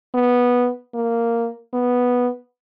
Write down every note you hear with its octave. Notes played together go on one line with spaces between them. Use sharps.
B3
A#3
B3